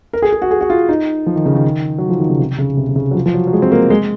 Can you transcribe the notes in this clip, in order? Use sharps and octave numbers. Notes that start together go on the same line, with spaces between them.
A#4
G#4
G#4
F#4
G#4
F#4
F4
D#4
F3
D#3
C#3
D#3
F#3
F3
D#3
C#3
C3
C#3
C3
C3
C#3
F#3
F3
F3
F#3
F#3
G#3
C4
A#3
G#3